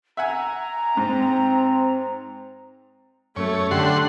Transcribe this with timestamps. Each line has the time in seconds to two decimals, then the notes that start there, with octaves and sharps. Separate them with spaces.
0.17 E5 F#5 G#5 A#5
0.97 G#2 C4
3.36 F#2 A3 C#5
3.71 D3 G4 F#5 C6